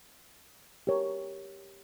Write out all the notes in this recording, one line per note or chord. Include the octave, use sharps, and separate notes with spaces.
G4 A#4 C#5